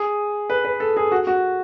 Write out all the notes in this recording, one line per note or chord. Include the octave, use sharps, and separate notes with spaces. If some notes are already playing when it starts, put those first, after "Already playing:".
Already playing: G#4
B4
B4
A4
G#4
F#4
F#4